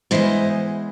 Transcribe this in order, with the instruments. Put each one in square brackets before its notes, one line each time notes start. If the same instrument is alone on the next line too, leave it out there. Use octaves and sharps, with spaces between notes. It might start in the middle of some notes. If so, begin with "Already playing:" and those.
[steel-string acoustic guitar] E2 C#3 E3 G#3 C5 D#5